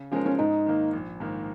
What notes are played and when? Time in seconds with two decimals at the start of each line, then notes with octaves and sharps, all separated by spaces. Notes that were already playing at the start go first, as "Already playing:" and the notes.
Already playing: C#3
0.12 F3 G#3 C#4 D#4 A#4
0.26 C#4
0.38 G#2 D#4
0.66 D#3 A#3
0.93 A#1
1.20 G#2 D#3 A#3